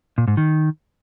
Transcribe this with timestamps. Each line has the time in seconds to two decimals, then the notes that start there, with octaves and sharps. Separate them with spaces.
0.18 A#2
0.28 G#2
0.37 D#3